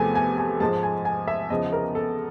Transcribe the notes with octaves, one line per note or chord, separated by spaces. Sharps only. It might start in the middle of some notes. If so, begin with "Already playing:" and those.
Already playing: E2 C3 F3 A3 G#5
G#5
G#5
G#2 F3 G#3 A5
G#5
G#5
E5
E2 C#3 F3 D#5
A#4
A4